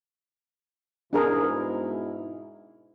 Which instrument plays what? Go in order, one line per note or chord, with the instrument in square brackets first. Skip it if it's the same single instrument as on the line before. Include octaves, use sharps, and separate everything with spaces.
[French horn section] G#2 B2 E4 [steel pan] D4 G#4 A#4